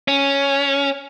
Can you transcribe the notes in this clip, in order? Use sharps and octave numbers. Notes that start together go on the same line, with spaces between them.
C#4